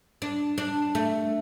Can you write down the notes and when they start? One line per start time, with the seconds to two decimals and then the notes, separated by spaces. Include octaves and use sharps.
0.22 D4
0.58 D4
0.95 A3